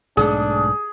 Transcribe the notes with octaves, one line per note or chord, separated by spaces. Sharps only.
B1 G#2 A3 D4 G#4